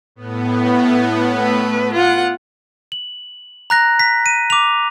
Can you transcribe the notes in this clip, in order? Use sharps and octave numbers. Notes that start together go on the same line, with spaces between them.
A2 B3
A3 B4
F4 F#5
F#7
A#5 F#6 A#6
B6
D#7
D6 F7